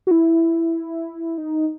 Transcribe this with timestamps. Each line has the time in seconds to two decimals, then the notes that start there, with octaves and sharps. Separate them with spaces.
0.07 F#4
0.11 E4
1.38 D#4